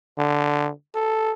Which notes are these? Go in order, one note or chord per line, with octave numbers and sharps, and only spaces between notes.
D3
A4